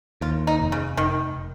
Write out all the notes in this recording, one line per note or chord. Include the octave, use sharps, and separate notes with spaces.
D#2 F4
D#4
F1
C#3
F1 D#3